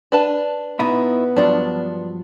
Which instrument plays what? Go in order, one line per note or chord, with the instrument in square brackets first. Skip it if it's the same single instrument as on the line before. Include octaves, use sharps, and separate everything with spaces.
[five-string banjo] D4 B4 A5
[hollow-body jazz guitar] B2 D#4 E4 [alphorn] B3
[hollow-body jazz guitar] G2 F3 F#3 [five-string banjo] D4 D5